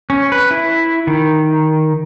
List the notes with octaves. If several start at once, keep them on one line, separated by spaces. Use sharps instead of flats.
C#4
B4
E4
D#3